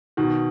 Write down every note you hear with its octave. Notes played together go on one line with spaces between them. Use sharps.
B2 D#3